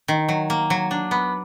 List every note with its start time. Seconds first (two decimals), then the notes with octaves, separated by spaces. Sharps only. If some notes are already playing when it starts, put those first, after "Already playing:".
0.08 D#3
0.29 F#3
0.50 A#3
0.70 F#3
0.91 D4
1.11 B3